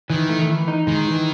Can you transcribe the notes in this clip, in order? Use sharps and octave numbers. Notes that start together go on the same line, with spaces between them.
D#3 E3
A3
E3
D#4
D#3 G#3
E3